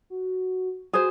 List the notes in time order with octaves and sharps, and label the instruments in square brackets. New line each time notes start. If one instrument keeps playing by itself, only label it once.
[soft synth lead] F#4
[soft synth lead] F#4 [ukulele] G#4 C5